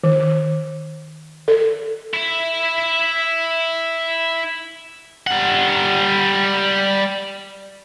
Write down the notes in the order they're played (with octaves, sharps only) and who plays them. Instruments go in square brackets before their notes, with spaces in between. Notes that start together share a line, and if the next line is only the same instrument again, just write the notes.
[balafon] D#3
A4
[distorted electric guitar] E4 E5
G3 F#5